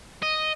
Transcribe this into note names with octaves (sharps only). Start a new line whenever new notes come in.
D#5